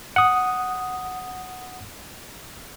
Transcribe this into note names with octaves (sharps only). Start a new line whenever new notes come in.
F#5 D#6